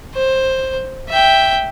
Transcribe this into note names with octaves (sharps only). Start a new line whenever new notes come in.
C5
E5 G5